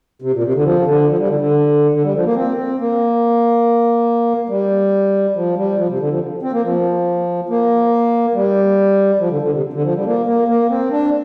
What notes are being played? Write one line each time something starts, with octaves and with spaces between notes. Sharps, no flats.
C3
A#2
C3
D3
F3
D3
F3
G3
D3
D3
D3
G3
F3
A#3
C4
C4
A#3
G3
F3
G3
F3
C3
D3
F3
C4
A#3
F3
A#3
G3
F3
D3
D3
C3
D3
F3
G3
A#3
A#3
A#3
C4
D4